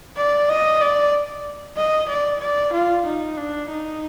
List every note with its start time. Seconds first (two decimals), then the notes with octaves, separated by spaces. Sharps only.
0.17 D5
0.49 D#5
0.81 D5
1.77 D#5
2.09 D5
2.41 D5
2.73 F4
3.06 D#4
3.37 D4
3.70 D#4